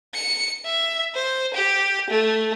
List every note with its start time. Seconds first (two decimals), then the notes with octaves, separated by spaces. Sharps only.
0.14 C#7
0.65 E5
1.15 C5
1.54 G4
2.09 A3